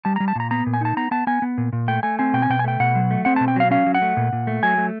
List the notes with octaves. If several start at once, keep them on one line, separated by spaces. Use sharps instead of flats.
G3 A5
G3 A#5
A5
A#2 A#5
B3 A#5
A#2
G#5
D#4 A5
B3 A#5
B3 A5
B3 G#5
B3
A#2
A#2
A3 G5
A3 G#5
C4 G#5
B2 G5
G#5
B2 G5
G#5
A3 G5
B2 F#5
F#3
A3
C4 F#5
B2 A5
G5
F#3 F5
C#4 F5
F#3
F#5
A3
A#2
A#2
A3
F#3 G#5
A3